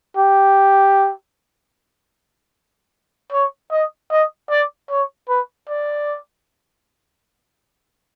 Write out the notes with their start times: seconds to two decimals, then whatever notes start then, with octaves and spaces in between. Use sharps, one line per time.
0.17 G4
3.32 C#5
3.71 D#5
4.11 D#5
4.50 D5
4.90 C#5
5.29 B4
5.69 D5